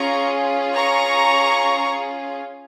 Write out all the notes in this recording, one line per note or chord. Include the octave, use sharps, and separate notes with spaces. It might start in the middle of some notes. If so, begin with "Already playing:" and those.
Already playing: C#4 F4 G#4 A#5 C#6
A#5 C#6